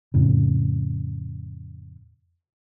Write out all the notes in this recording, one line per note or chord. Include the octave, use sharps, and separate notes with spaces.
F2 A2 C#3